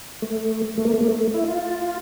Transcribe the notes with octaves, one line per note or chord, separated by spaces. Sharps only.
A3
A3
A#3
A3
A#3
A3
E4
F4